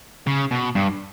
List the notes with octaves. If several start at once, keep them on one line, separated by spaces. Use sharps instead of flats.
C#3
B2
G2